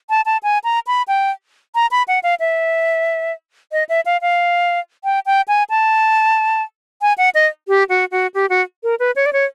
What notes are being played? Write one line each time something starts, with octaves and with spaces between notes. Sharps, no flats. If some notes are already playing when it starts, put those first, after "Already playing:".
A5
A5
G#5
A#5
B5
G5
A#5
B5
F#5
F5
E5
D#5
E5
F5
F5
G5
G5
G#5
A5
G#5
F#5
D#5
G4
F#4
F#4
G4
F#4
A#4
B4
C#5
D5
C#5